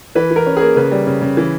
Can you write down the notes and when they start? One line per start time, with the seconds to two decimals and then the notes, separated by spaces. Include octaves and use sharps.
0.15 E3 B4
0.31 E3
0.36 A#4
0.46 C#4
0.56 A#3 G#4
0.76 C#3 B4
0.92 G3
1.07 C#3
1.22 C#3
1.37 E3